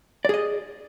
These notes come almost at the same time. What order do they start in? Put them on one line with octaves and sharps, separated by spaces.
D5 G#4 D#5